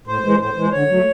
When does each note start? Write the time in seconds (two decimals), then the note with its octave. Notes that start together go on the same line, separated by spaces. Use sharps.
0.07 A2 C5
0.24 E3 G#3
0.40 A2 C5
0.56 E3 G#3
0.72 D3 C#5
0.89 F#3 A3